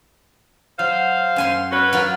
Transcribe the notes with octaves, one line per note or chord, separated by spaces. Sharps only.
F#3 C5 F5
F#2 G#5 C6
C#4 F#4 B4
F#3 F4 A#4